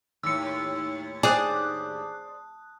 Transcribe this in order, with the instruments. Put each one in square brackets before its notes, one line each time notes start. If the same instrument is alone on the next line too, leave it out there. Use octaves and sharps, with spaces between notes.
[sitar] D#2 A2 [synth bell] E6 C#7
[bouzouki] D4 C5 D5 [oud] G#4 [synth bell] A5 D#6 F#6